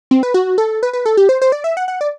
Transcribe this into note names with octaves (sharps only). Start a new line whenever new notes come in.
C4
B4
F#4
A4
B4
B4
A4
G4
C5
C5
D5
E5
F#5
F#5
D5